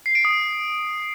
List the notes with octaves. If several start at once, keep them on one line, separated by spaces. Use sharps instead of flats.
C7
D7
D#6